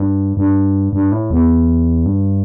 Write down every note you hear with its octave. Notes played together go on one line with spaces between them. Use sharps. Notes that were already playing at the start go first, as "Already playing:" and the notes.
Already playing: G2
G2
G2
A2
E2
G2